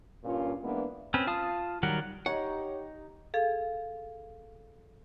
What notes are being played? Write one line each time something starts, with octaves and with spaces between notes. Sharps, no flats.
G2 A#2 C#4 F4
E3 G#3 A#3 B3 D4
C4 C#4 B4
F4 F5 A5 D#6
D#3 F#3 G3 A#4 F#5
D#4 G4 C#5 F#5
G#4 A4 F5